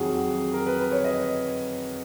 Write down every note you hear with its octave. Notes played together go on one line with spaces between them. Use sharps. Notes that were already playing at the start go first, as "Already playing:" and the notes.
Already playing: F2 D#3 F#3 F#4 G#4
A#4
B4
B4
C#5
D#5